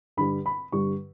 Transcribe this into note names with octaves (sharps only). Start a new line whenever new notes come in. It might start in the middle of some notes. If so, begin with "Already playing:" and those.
G2 D3 G3 B5
B5
G2 D3 G3 C#6